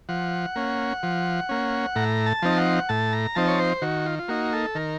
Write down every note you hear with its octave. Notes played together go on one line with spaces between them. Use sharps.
F3 F#5
A#3 C#4
F3
A#3 C#4
A2 A#5
A5
F3 C4 D#4
F#5
A2 A5
A#5
F3 C4 D#4 A5
C#5
C5
D#3 F#4
F4
F4
A#3 D#4 F#4
A4
D#3 A#4